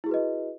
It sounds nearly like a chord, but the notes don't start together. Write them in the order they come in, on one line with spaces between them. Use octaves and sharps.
E4 G#4 F#4 B4 D#5